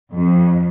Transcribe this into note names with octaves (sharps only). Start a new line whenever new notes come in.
F2